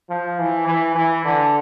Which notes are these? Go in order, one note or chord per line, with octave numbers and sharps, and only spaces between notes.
F3
E3
E3
E3
D3